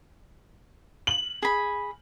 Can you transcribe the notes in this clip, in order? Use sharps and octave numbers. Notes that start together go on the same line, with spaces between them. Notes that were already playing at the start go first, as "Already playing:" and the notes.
F#7
G#4 B5